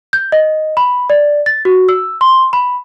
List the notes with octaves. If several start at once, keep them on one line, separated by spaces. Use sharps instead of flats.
G6
D#5
B5
D5
A6
F#4
E6
C6
B5